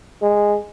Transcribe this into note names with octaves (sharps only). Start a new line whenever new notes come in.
G#3